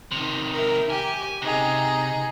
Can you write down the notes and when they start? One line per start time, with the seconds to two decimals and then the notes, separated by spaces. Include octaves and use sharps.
0.11 C3 D#3
0.52 A#4 E5
0.90 G4 G#5
1.42 C3 D#4 G#4